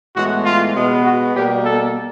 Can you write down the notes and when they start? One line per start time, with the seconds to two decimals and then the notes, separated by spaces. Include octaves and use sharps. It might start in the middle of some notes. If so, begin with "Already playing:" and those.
0.14 A2 E3 G#3 B3 F#4
0.44 F4
0.74 B2 G#3 B3
1.04 F#4
1.34 B2 G3 A#3 G4
1.64 A4